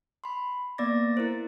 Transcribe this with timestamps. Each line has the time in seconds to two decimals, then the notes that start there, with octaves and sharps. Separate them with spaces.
0.24 B5 C6
0.78 A#3 B3 D5 D6 A6 A#6
1.17 E4 A#4 C5